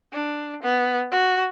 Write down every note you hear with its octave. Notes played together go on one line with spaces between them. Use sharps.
D4
B3
F#4